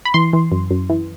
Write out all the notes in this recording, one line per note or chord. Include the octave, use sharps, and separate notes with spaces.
B5
E3 C6
E3
F#2
F#2
E3